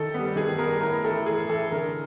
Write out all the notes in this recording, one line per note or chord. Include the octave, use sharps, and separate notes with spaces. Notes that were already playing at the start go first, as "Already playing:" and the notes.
Already playing: D#3 A4
G3 B3
D#3 G#4
B3 A#4
G3
A2 A#4
E3 A3 A4
A2 G#4
E3 A3 A4
D3 A#4